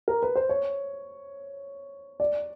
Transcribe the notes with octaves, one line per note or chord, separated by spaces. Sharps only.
A#4
B4
C5
C#5
D5